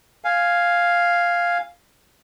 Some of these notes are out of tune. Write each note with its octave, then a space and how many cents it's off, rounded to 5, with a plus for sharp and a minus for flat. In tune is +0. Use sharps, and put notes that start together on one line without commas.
F5 +0 G#5 +0